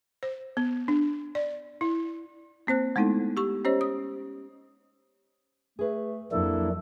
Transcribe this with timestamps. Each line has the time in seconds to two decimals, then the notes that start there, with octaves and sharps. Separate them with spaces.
0.23 C5
0.57 B3
0.88 D4
1.35 D5
1.81 E4
2.67 A#3 C4 C5 F#6
2.96 G#3 A3 B3 D#4 E4 A4
3.37 G4 C#6
3.65 C#4 G4 C5 C#5 D#5
3.81 D#6
5.79 A3 G#4 B4
6.32 F2 F#3 A#3 D4 E4 A4